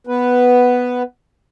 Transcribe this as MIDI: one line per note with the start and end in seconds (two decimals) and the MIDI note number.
0.07 1.02 59
0.07 1.02 71